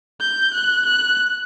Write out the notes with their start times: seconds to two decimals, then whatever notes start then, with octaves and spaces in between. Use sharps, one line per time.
0.21 G6
0.54 F#6
0.85 F#6